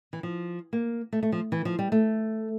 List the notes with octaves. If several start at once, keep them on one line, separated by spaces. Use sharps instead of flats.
E3
F3
A#3
A3
A3
F3
E3
F3
G3
A3